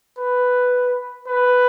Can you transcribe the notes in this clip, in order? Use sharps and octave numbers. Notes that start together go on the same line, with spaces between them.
B4
B4